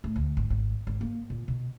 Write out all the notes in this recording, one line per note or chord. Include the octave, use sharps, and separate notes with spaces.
A2
D2
G#1
G#1
G#1
A#3
A#2
B2